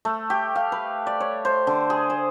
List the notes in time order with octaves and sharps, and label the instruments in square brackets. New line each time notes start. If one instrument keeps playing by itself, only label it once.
[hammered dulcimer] A3
G4
F5
B4
D5
C#5
C5
D3
G#4
C5